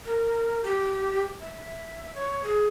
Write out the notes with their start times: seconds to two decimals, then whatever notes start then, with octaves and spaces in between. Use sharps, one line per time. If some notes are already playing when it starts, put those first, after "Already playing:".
0.05 A#4
0.63 G4
1.41 E5
2.15 C#5
2.44 G#4